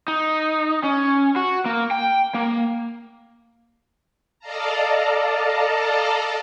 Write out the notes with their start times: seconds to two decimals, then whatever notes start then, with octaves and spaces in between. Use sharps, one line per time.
0.08 D#4
0.84 C#4
1.36 F#4
1.65 A#3
1.91 G5
2.34 A#3
4.39 A4 D5 D#5 F5 A5 A#5